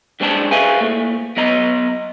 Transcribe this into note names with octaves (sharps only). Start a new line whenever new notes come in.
F#2 G#3 C4 D4 F#4 A5
G#4 B4 C5 E5 F5 G#5
A#2 A3
F#3 B3 D#5 A#5